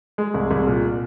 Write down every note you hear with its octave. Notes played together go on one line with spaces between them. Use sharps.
G#3
C2
C2
A#2